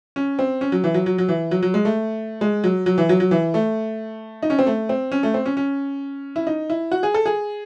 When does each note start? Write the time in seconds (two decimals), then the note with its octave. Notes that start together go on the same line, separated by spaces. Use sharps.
0.16 C#4
0.39 C4
0.61 C#4
0.72 F#3
0.84 E3
0.94 F#3
1.06 F#3
1.18 F#3
1.29 E3
1.51 F#3
1.63 F#3
1.74 G#3
1.85 A3
2.41 G#3
2.64 F#3
2.86 F#3
2.98 E3
3.09 F#3
3.20 F#3
3.31 E3
3.54 A3
4.43 D#4
4.50 C#4
4.59 C4
4.66 A3
4.89 C4
5.12 C#4
5.23 A3
5.34 C4
5.46 C#4
5.57 C#4
6.36 E4
6.47 D#4
6.70 E4
6.92 F#4
7.03 G#4
7.14 A4
7.26 G#4